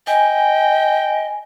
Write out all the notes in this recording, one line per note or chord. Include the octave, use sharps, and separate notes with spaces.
D#5 G5 G#5